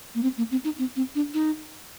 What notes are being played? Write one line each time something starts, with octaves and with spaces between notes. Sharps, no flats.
A#3
C4
A#3
C4
D#4
C4
C4
D4
D#4